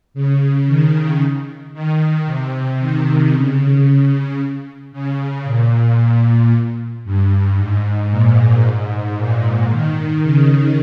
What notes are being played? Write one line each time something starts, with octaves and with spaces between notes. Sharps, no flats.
C#3
D#3
D#3
C3
D#3
C#3
C#3
C#3
A#2
G2
G#2
A#2
G#2
A#2
D#3
C#3